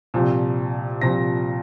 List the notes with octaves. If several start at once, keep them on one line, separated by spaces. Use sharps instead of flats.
C2 A#2 F3
C2 A#2 F3 A#6